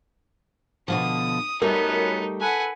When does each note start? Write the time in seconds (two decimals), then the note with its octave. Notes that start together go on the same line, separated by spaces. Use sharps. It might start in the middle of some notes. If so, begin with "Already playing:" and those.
0.88 B2 D3 F3 D#6
1.62 F#2 G3 A3 B3 D#4 A#4
2.40 A4 B4 F#5 G#5